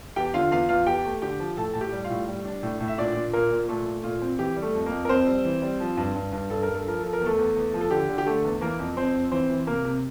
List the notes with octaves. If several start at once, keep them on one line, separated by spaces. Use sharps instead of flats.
E2 G4 G5
D3 F4 F5
E2 F4 F5
E2 F4 F5
E2 G4 G5
A3
D3 G4 G5
F3
A2 A4 A5
A2 A5
G4 G5
G3
F4 F5
A2
G3
D4
A2
A2
E5
A#2 D4 D5
A#2
A#2 A#3 A#4
A#2
A#2 A3 A4
A3
A#2 F4
C4
E3 G4
G3
A3 A4
F2
A#3 A#4
F2
A#4
F2 C4 C5
G3
E3
G3
F3
G2
G2
G2
G2 A4
A#4
G2
A4
F3 A#4
F3 A4
A#4
E2
A3 A4
E2
E2
F3
A4
D3 G4
D3
G4
D3 A3 A4
E2
E3 A#3 A#4
F2
F2 C4 C5
F2
E3 C4 C5
E3
C3 A#3 A#4
C3